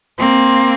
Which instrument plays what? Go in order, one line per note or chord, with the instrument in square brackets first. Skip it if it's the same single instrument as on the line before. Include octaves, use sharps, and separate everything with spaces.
[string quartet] A#3 C4